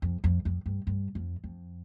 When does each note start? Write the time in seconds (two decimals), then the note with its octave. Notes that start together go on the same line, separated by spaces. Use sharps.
0.02 F2
0.24 F2
0.45 F2
0.66 G2
0.87 G2
1.15 F2
1.44 F2